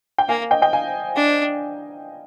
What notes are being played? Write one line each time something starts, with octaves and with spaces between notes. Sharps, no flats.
G5
A#3 F5 G#5
D#5 G5
D#5 G5
F5 G#5
D4